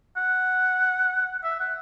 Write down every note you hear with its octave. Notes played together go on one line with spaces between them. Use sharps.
F#5
E5
F#5